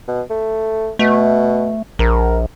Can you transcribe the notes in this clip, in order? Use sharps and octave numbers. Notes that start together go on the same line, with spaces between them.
B2
A3
B2 A3
A#1 A#4